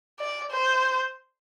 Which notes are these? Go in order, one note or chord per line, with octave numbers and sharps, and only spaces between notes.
D5
C5